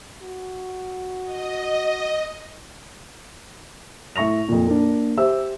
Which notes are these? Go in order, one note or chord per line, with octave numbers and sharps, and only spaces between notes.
F#4
D#5
A2 E5 C#6 A#6 F7
F2 A#2
A#3 D4
G4 C5 E5 E6